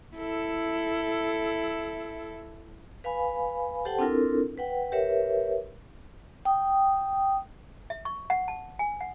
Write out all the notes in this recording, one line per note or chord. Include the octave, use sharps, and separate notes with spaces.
E4 A4
B4 F5 G#5 B5
G4 A4 C5 F#5 G5 A5
C4 D4 E4 F4 A4 A#4
B4 F#5 G5
G4 A#4 B4 C#5 E5
G5 D#6
E5
C#6
F#5
A5
G#5
F#5